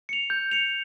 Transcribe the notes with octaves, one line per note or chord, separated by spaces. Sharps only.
C#7 F7
G6
C#7 F7